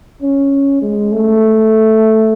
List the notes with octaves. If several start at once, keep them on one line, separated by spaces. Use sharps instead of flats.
C#4
G#3
A3